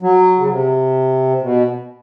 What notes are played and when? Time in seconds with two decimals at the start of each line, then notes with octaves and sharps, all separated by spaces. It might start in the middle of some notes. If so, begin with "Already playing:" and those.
0.02 F#3
0.39 C#3
0.49 C3
1.42 B2